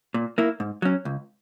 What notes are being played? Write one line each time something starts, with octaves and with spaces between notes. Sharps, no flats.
A#2
A#3 E4
G#2
F#3 C#4
C#2